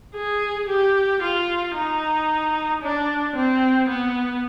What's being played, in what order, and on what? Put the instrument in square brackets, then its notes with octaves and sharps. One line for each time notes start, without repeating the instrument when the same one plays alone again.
[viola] G#4
G4
F4
D#4
D4
C4
B3